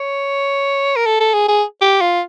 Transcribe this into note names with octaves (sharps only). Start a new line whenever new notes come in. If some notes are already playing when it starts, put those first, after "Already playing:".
Already playing: C#5
A#4
A4
A4
G#4
G#4
G4
F4